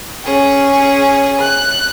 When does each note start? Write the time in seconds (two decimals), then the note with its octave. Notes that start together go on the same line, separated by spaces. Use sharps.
0.25 C#4 G#4
1.40 F#6